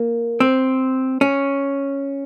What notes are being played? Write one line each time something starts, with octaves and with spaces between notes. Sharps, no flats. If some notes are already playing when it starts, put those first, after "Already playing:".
Already playing: A#3
C4
C#4